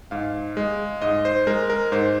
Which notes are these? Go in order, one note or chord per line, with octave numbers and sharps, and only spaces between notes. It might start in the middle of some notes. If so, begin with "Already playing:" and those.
G#2 F5
G#3
G#2 D#5
C5
G#3 A#4
A#4
G#2 C5